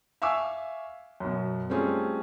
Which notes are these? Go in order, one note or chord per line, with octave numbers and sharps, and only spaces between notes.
E5 F5 G#5 C#6 D6 E6
F#2 B2
G3 A3 C4 C#4 F4 G#4